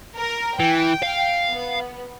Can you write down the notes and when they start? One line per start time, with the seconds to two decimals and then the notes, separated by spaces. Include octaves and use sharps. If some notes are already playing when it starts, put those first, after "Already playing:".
0.17 A#4
0.60 E3 G5
1.03 F5
1.50 B3